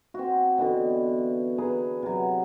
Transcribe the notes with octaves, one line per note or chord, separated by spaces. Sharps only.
C4 F#4
B2 D3 E3
G#4 B4 A#5
C3 F#3